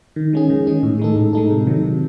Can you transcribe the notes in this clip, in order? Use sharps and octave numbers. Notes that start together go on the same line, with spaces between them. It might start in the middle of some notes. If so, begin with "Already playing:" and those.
D#3
G#3 C#4 G#4
D#3
G#3 C#4 G#4
A2
G#3 D#4 A4
A2
G#3 D#4 A4
C3
D#3 F#3
C3